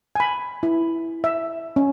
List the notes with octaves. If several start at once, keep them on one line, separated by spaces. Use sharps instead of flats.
G#5 B5
E4
E5
C#4